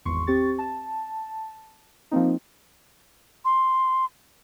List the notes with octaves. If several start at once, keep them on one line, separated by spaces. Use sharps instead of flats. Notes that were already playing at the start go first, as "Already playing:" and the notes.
G#1 E2 C6 C#6
C4 G4 C#6 A6
A5
F3 A#3 C4 D#4
C6